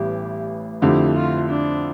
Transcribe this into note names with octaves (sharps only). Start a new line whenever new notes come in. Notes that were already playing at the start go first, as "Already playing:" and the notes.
Already playing: A1 A2 E3 G3 B3 G4
F2 D3 F3 A3 E4 G4
F4
D4